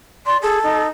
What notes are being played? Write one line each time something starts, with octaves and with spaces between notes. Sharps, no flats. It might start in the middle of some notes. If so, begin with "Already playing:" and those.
D5 C6
G#4 A4
D#4